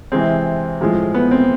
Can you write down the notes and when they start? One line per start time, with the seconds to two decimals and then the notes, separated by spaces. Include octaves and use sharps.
0.12 C3 E3 G#3 C4
0.81 A2 F3 G#3
1.14 B3
1.31 C4